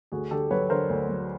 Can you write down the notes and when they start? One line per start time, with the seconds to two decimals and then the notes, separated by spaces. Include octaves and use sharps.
0.12 D2 F#4 G#4
0.31 D3 G4 A4
0.51 F#3 B4 C#5
0.70 D3 A#4 C5
0.89 D2
1.09 F#3